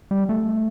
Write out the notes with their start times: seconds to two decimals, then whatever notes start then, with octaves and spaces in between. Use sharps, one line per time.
0.11 G3
0.29 A3